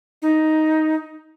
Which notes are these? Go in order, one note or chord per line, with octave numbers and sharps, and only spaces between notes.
D#4